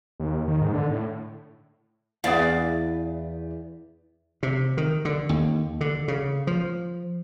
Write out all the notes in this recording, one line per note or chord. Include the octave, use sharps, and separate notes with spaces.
D#2
D#3
G#2
D3
A2
E2 B3 D5 F5
C3
D#3
D3
D#2
D3
C#3
F3